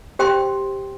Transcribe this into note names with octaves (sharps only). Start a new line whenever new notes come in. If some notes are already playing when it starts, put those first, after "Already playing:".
G4 C5 G5 C6